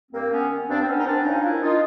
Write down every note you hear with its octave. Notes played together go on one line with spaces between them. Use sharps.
G2 A#3 C4
B3 C#4
D#3
G2 C4 D4
C4
B3 C#4
D#3 D#4
C4 D4
G2 C#4 D#4
F4
D4 E4
D#3
D#4 F4